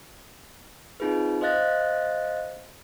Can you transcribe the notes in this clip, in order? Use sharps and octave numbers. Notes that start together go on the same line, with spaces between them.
C4 D#4 F4 G#4 B4
C5 D#5 F5 F#6 A6 A#6